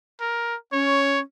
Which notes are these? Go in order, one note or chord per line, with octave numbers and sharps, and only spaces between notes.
A#4
C#4 C#5